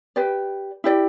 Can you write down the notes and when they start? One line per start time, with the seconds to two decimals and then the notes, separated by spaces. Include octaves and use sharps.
0.16 G4 B4 D5
0.84 E4 G4 D5